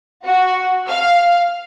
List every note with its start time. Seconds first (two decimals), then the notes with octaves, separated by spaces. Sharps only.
0.25 F#4
0.88 F5